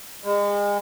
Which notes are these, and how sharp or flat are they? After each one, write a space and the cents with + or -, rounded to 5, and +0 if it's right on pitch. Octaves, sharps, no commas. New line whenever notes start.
G#3 -35